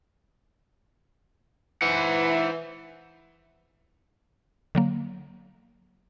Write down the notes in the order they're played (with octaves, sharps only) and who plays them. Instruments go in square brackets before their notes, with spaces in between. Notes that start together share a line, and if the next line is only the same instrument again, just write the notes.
[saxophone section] E3 [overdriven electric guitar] C5 F#5
[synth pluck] D3 F#3 A#3